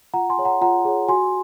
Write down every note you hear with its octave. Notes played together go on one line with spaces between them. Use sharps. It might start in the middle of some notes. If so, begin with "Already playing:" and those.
F4 F#5 A#5
G#5 C6
G#4 C#5
F#5 A#5
F4 F#5 A#5
G#4 C#5
F#4 G#5 C6